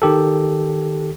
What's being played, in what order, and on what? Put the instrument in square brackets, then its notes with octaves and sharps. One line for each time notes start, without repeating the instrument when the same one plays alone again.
[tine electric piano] D#3 G4 A4